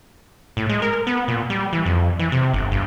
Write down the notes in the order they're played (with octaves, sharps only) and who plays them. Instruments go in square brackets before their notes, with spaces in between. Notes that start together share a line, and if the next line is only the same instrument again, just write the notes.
[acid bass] A2
G#3
A#4
B3
A#2
G3
E3
F2
E3
C3
G1
G2